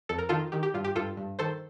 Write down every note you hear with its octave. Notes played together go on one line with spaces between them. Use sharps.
F2 A4
A#4
D#3 F4 A4
D#3 G4
G4
G2 F4
G4
G2 F4 A4
G2
D#3 A4 C5